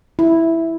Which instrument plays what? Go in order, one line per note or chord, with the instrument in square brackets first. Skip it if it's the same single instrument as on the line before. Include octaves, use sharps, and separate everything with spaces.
[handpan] E4